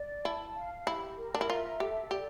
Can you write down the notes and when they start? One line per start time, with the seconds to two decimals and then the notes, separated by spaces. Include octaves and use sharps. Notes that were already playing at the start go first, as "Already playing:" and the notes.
Already playing: D5
0.25 E4 A5
0.56 F5
0.87 E4 G4
1.18 A#4
1.34 D4
1.41 E4
1.49 F4 E5
1.80 G4 A4
2.11 G4 D5